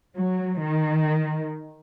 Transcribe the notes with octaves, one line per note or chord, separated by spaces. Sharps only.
F#3
D#3